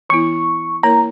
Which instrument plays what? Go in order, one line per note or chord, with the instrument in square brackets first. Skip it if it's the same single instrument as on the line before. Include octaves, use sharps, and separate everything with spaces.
[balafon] E3 B3 E4 [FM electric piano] C#6
[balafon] A#3 E4 A#4 C#5 [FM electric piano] A#5